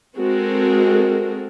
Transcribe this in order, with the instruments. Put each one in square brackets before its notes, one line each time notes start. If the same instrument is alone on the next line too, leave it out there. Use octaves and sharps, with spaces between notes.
[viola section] G#3 C4 F#4 A4 A#4